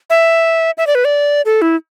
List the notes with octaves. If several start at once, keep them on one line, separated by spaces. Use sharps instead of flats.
E5
E5
D5
B4
D5
A4
E4